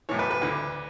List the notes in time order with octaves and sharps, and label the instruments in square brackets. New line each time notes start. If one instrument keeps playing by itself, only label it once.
[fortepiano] B1 A2 E3 C#5
B4
B4
D2 D3